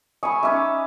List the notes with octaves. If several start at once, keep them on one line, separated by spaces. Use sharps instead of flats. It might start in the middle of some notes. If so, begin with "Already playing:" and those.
E5 G#5 B5 C#6 D#6
C#4 D#4 E5 D6